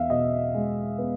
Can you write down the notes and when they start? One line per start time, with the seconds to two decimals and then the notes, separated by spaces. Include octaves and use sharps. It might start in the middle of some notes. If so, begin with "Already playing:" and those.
Already playing: E2 B3 E5 F5
0.10 B2 D#5
0.54 G#3
0.98 B3